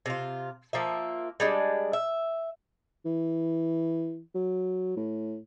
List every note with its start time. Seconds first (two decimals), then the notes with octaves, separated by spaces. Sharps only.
0.06 C3 F4
0.73 F3 A#3 E5
1.40 G3 G#3 D4
1.93 E5
3.05 E3
4.34 F#3
4.96 A2